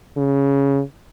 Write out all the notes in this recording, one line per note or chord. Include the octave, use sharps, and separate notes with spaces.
C#3